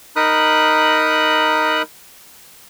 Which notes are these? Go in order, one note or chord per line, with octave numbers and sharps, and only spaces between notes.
D#4 A#4 B5 D#6 F#6